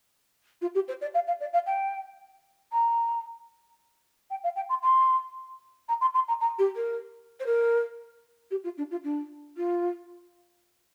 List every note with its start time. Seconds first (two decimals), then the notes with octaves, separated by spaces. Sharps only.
0.61 F4
0.74 G4
0.88 C5
1.01 D5
1.14 F5
1.27 F5
1.40 D5
1.53 F5
1.66 G5
2.72 A#5
4.30 G5
4.43 F5
4.56 G5
4.69 C6
4.83 C6
5.88 A#5
6.01 C6
6.14 C6
6.28 A#5
6.40 A#5
6.58 G4
6.75 A#4
7.39 C5
7.46 A#4
8.51 G4
8.63 F4
8.77 D4
8.91 F4
9.03 D4
9.57 F4